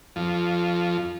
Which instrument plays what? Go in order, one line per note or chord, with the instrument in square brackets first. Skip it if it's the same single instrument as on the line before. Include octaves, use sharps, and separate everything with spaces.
[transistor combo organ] F2